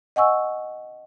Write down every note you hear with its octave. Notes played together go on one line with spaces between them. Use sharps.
D#5 F#5 G#5 C#6 E6